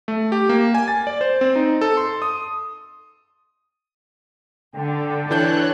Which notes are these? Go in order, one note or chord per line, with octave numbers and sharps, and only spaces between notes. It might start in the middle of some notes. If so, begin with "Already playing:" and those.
A3
G4
A#3
G#5
A6
D5
C5
C4
D#4
A4
C6
D#6
D3 G5
E3 D4 A4 C#5 F#6 G6